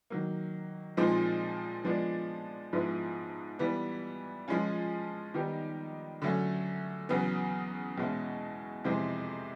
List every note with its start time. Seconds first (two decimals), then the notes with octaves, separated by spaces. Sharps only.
0.10 D#3 F#3 A#3
0.97 A#2 F3 G#3 C4 D#4
1.85 F3 G#3 B3 D4
2.73 G#2 F3 G#3 B3 E4
3.59 E3 G3 B3
4.48 F3 G#3 C#4 F4
5.34 D#3 G3 B3 D#4 G4
6.22 D3 F#3 A3 C#4
7.09 E2 C#3 F#3 B3
7.98 E2 B2 G#3 C#4 E4
8.84 F2 C3 E3 G#3 C4